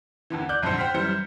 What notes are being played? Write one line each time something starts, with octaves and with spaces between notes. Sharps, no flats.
D#2 D3 E3
D5 D6 F#6 G6
A#1 F2 G#2 D3 C5 C#7
C5 G5 C6 F6 B6
F#2 E3 G3 C5 C#7